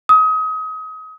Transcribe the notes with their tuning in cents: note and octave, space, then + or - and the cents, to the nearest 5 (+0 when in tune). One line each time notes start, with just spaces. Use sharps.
D#6 +30